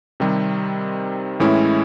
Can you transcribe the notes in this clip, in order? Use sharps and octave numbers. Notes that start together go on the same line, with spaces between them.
C3 D#3 G3 C4
A2 E3 G#3 C#4 E4